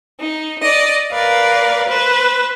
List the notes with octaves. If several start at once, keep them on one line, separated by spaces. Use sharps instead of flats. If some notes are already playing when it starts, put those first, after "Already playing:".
D#4
D5 D#5
A#4 B4 D5 F5
B4 C5